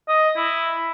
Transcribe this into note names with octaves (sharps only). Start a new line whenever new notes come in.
D#5
E4